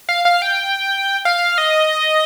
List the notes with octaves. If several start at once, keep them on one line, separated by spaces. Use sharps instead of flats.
F5
F5
G5
F5
D#5